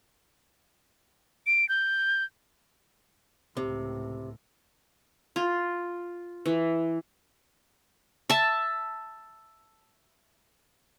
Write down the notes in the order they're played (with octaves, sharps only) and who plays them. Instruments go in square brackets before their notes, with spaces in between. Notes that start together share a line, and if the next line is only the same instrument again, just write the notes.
[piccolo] D7
G6
[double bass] C#2 A2 [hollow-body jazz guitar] C3
[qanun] F4
E3
E5 A5